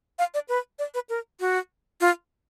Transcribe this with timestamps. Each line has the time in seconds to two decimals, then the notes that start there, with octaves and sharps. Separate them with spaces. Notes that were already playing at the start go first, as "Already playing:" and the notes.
0.19 F5
0.34 D5
0.48 B4
0.79 D5
0.94 B4
1.09 A#4
1.40 F#4
2.01 F4